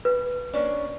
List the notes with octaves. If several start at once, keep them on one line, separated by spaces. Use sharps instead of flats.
B4
A#3 C#4 D4